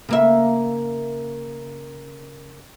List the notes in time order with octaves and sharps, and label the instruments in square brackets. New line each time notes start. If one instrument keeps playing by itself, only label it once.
[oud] C#3 A#3 E5